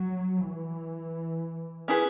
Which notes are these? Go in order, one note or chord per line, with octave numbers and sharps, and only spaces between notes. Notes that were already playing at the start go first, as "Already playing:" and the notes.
Already playing: F#3
E3
C#4 E4 G#4 B4